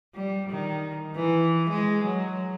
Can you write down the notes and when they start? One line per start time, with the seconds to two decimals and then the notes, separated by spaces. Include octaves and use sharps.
0.15 G3
0.50 D#3
1.16 E3
1.70 G#3
2.04 F#3